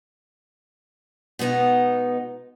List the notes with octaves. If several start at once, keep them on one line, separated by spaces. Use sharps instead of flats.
B2 G#3 B3 D#4